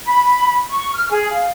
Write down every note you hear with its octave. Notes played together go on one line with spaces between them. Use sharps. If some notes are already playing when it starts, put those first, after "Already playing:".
B5
C#6
F6
G#4
F5